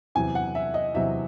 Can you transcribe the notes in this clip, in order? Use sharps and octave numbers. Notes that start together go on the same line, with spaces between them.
E2 C3 F#3 G#5
F#5
E5
D#5
E2 C3 F#3 E5